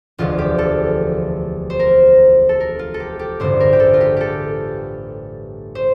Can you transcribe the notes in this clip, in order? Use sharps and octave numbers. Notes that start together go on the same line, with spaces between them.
E1 D2 D3 F3 F4
G4
A4
C5
A#4
A4
A#4
F4
A4
G4
G4
A1 G2 D3 C5
A#4
G4
A4
F4
G4
G4 A4
C5